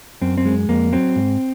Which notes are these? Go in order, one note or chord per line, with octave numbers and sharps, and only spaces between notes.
F#2 C4
C4
G#3
F2 A#3
F#3 C4
G#2